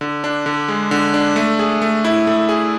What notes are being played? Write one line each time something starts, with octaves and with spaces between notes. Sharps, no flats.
D3
D4
D3
G#3
D3
D4
A3
G#4
A3
E4
A3
G#4